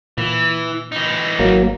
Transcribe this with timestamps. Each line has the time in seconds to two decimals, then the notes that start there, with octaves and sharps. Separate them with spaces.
0.18 A#2 E3
0.92 E3 D#4
1.39 G#1 F#3 A#3